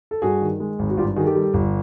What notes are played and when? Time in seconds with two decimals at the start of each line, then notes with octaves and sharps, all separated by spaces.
0.11 A4
0.22 G2 F#4 G#4
0.41 D#3
0.60 G#3
0.79 G#1
0.89 F#4
0.97 G2 F4 G4
1.16 D#3 F#4 G#4
1.25 G4 A4
1.35 G3
1.54 G1